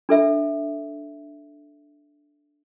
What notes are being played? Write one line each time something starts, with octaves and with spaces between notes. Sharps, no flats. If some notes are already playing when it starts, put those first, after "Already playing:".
D4 A4 E5